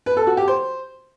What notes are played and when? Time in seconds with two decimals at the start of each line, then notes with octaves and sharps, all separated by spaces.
0.06 B4
0.17 A4
0.27 F#4
0.37 G4
0.48 C5